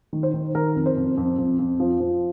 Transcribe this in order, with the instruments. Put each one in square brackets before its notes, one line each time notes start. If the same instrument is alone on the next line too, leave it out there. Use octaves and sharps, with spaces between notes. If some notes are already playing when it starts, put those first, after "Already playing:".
[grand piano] D#3
C5
D#3
D#3 A#4
F2
C5
F2
F2
F2
F2
F3
F3